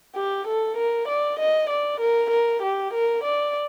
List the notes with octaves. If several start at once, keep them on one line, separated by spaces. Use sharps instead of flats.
G4
A4
A#4
D5
D#5
D5
A#4
A#4
G4
A#4
D5